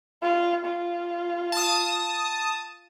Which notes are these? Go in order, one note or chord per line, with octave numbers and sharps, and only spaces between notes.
F4
F4
A5 D#6